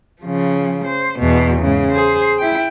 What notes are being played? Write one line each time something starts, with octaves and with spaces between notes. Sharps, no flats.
C#3 F3
C5
E2 B2
G#2 C#3
G#4 C5
E4 G5